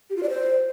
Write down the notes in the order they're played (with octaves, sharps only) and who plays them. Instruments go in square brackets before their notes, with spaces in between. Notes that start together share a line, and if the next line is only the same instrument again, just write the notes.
[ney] G4
F4
D5
C5